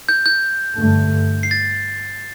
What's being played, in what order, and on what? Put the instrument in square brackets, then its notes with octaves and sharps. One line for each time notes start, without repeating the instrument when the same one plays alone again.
[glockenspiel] G6
G6
[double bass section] G2 D3 A3
[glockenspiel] C7
A6